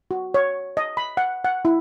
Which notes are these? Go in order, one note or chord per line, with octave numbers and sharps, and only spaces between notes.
F#4
C#5
D#5
B5
F#5
F#5
E4